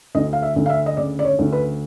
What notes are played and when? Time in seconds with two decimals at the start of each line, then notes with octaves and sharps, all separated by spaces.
0.15 D2 D#5
0.33 F5
0.42 E5
0.56 D2
0.66 F5
0.70 E5
0.86 D#5
0.97 C#3 D5
1.19 D5
1.25 C#5
1.39 D2
1.53 B4